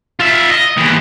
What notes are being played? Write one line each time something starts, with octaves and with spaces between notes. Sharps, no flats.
F4 E5
D#5
D#2 E3